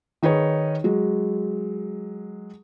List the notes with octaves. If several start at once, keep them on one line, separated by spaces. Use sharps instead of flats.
D#3 D#4 G#4 B4 C#5
F#3 G#3